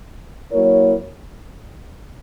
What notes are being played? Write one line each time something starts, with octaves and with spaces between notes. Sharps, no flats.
F#3 A#3 E4 A#4 C#5